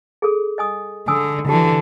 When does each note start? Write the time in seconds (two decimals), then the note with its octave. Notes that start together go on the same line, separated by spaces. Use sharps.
0.22 G#4 A4
0.58 D#5 G#5 D#6
1.08 D3 G#5 D#6 E6
1.48 D3 E3 F#4 G4 A5